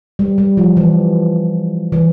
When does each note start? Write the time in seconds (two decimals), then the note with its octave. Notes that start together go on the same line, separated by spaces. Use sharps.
0.19 G3
0.38 G3
0.57 F3
0.77 E3
1.92 E3